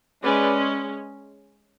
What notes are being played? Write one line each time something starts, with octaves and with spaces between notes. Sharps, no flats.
G#3 C#4 B4 D5